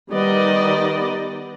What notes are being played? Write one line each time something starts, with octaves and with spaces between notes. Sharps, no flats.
D#3 G3 B3 D5 D#5